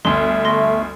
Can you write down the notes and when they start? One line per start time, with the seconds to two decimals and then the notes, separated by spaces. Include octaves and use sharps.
0.05 G1 D2 E5 C6
0.45 A3 C6 A#6